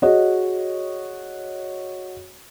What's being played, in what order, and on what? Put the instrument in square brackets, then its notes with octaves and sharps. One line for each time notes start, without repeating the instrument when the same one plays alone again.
[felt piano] F#4 G#4 C#5 D#5